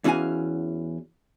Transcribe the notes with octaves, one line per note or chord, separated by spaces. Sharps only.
E2 E3 C#4 F#4 F5 G#5